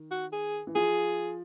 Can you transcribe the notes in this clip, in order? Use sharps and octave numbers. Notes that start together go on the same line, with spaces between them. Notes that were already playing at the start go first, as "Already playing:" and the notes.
Already playing: D#3
F#4
G#4
E3
F3 G#4